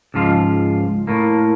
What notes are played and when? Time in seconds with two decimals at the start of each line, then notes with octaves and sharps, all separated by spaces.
0.14 C#2 G#2 F3 F4
1.07 A2 A#3